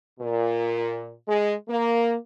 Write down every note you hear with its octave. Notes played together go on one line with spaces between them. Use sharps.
A#2
G#3
A#3